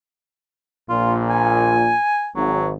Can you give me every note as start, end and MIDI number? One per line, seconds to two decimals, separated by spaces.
0.90 1.95 34
0.90 1.95 46
0.90 1.14 65
1.30 2.29 80
2.36 2.74 32
2.36 2.67 54